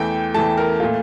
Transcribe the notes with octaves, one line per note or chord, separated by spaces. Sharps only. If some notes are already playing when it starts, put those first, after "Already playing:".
Already playing: E2 E3 A3 G5
E2 E3 A3 A5
A#4
A#2 A3 F4